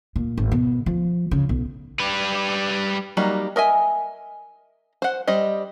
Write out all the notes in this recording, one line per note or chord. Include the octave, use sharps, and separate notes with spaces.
A#2
G#1
B2
F3
C#3
B1
G3 B4
F#3 G3 A#3 D#4
A#4 D#5 E5 G#5
C5 F#5
G3 C5 D#5